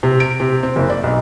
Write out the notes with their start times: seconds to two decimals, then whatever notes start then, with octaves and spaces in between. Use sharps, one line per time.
0.03 C3
0.20 D7
0.40 C3
0.63 C4
0.76 F#1
0.90 D5
1.03 B1